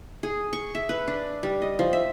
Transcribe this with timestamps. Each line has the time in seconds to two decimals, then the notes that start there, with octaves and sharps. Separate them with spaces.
0.23 G#4
0.53 C#6
0.75 E5
0.89 B4
1.08 D4
1.43 G3
1.62 D#5
1.79 F3
1.93 E5